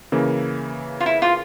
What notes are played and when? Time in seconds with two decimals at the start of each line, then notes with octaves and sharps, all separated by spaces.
0.12 C#3 E3 A#3
1.00 F4
1.06 E4
1.22 F4